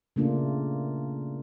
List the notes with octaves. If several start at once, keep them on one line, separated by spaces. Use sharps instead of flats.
C#3 A3 A#3 D4 F4